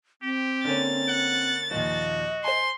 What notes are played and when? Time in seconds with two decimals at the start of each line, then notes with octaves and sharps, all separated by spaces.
0.22 C4 G4
0.65 D3 A#3 C#4 A6
1.08 F#5
1.71 D#2 A#2 F3 F#4 D#5
2.44 C5 G#5 C6